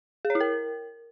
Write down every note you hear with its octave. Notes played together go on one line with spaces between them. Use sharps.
G#4
C#5
E4
A#4